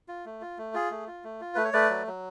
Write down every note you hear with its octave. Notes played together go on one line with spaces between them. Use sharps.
F4
A3
F4
A3
F4 G#4
A3
F4
A3
F4
A3 B4
C#5
A3 B4 D5
F#3
F#3